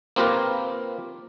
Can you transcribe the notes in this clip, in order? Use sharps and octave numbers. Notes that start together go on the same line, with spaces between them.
A#3 C4 F4 G4 A#4 B4